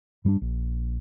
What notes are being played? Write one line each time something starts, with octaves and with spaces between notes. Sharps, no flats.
G2 G3 B3 D4
A#1